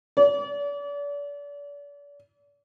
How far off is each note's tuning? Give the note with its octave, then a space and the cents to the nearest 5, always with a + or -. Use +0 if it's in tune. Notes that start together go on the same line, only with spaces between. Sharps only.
D5 -40